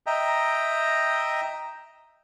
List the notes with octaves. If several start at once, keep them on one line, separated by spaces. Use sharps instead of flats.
D#5 E5 G5 A#5